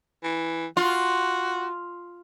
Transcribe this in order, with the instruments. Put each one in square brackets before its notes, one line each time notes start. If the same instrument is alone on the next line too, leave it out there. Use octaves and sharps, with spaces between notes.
[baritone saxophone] E3
[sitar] F4 [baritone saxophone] F#4